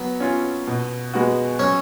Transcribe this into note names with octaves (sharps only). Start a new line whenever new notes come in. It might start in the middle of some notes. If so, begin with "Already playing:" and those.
Already playing: F#3 B3
C#4 F4
B2
G#3 B3 F#4
F#3 C#4